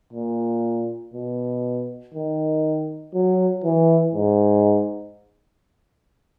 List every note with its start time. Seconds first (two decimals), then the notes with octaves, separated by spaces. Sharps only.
0.13 A#2
1.14 B2
2.14 D#3
3.15 F#3
3.64 E3
4.15 G#2